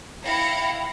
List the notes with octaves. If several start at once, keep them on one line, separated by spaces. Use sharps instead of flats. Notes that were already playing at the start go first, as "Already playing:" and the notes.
E4 F5 G5 A#6 C#7